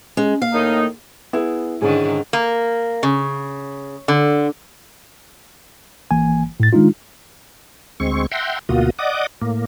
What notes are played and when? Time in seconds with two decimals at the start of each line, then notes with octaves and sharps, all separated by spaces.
0.17 G#3 C#4
0.42 A#3 F5
0.54 A2 D#3 D#4
1.33 B3 E4 G#4
1.82 G#2 D3 D#3 G#3 C#4 D4 G#4
2.33 A#3
3.03 C#3
4.08 D3
6.11 G#1 E3 A#3 G#5
6.60 A2 A6
6.73 D#3 G#3 D4 D#4 F4
8.00 D2 G#3 C4 C#6
8.32 E5 F#5 G5 A#5 C6
8.69 D2 B2 A#3 F4 F#4 D#6
8.99 D5 D#5 F#5 D6 D#6
9.42 A2 A#3